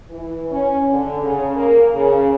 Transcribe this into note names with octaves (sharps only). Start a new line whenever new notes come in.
E3
C#4
D3
C#3
A#3
C#3